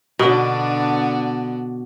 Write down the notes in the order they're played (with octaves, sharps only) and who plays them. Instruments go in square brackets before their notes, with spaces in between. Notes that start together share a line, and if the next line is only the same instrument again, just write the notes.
[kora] B2 [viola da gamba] D3 B3 D4